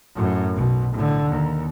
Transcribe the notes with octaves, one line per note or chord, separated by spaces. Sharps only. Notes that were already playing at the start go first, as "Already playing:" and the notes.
F#2 A2
B1 B2
A2 D3
D#2